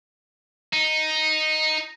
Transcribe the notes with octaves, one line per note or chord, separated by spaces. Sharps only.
D#4